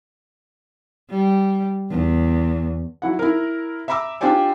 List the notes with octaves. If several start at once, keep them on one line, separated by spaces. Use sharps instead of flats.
G3
E2
F#3 E4 F#5
E4 A#4
E5 A#5 B5 D6 E6
D4 F4 G4 C5 D5 G#5